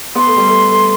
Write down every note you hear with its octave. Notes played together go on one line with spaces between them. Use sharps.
B3 C6
A3
G3
A3
A3